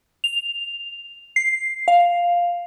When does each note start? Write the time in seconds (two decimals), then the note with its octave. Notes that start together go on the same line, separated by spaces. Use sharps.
0.24 F7
1.36 C7
1.88 F5